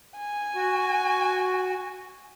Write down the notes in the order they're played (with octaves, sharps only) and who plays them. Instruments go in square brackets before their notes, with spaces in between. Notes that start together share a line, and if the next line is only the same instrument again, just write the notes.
[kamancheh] G#5
[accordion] F#4